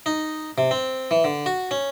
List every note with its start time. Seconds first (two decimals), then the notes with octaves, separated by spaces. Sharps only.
0.06 D#4
0.58 C3
0.71 C4
1.11 E3
1.24 D3
1.46 F#4
1.71 C#4